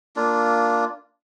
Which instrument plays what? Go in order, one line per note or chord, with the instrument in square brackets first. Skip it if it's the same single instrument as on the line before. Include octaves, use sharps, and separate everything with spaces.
[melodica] A#3 D4 F4